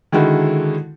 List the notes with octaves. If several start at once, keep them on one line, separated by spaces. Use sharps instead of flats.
D3 D#3 G#3 E4 F#4 A4